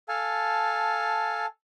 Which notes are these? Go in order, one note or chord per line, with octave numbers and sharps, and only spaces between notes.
A4 F5 G#5 A5